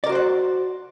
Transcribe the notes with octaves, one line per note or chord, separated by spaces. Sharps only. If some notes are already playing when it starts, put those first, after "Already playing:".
F#4 A#4 C5 D5 F#5